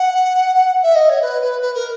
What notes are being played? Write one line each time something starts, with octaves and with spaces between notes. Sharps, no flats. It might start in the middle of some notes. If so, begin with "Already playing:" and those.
Already playing: F#5
E5
D#5
C#5
B4
B4
B4
A#4